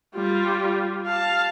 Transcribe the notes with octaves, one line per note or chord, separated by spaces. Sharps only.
G3 F4
F5 A5